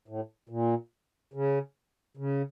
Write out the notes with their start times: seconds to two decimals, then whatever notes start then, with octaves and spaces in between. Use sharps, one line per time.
0.08 A2
0.49 A#2
1.34 C#3
2.17 C#3